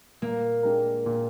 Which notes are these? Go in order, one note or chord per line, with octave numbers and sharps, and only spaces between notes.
A#2 A#3
G#3 D4 G4 A#4
A#2